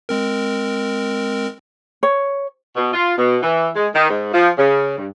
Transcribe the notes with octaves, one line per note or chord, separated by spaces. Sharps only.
G#3 C4 A#4
C#5
B2
F4
B2
E3
G#3
D#3
G#2
F3
C#3
G2